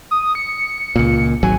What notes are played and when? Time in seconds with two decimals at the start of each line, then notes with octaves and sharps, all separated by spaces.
0.11 D#6
0.35 C#7
0.96 C#2 A#2
1.43 G#1 F#3 G#5